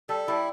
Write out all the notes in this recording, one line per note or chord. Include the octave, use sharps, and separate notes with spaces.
G3 A4
G3 E4